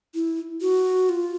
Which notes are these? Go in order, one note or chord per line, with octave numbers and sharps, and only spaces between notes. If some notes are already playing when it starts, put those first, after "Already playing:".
E4
F#4
F4